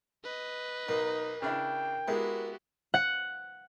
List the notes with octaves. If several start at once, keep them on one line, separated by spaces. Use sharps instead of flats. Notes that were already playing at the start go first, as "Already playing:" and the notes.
B4 D#5
B1 A#3 D#4
C#3 D4 E4 G5
G#3 A#3 B3 E4 F#4 G4
F#5